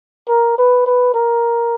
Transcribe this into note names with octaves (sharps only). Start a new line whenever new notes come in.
A#4
B4
B4
A#4